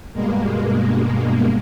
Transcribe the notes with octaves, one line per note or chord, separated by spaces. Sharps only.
G2 B2 G#3 A#3